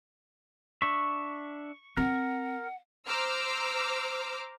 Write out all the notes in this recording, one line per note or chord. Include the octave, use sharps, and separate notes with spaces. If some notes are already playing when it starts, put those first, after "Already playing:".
D4 E5 C#6
C4 A#4 F#5
C5 A#5 D6 E6 F6